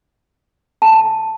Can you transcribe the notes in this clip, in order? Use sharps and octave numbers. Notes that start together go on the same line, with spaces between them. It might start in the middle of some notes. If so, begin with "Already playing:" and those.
A5